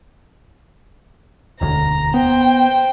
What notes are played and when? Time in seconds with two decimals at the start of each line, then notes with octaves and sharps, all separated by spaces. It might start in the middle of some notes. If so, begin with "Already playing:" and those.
1.61 E1 D2 A#5
2.14 B3 C5 G5